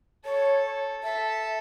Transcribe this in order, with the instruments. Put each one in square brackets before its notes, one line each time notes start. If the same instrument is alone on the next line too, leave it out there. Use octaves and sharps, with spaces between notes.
[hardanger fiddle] A4 [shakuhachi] C#5
[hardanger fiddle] A4 [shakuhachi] E5